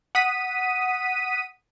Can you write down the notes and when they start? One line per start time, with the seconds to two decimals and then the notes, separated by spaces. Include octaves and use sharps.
0.15 F#5 D#6 B6 D#7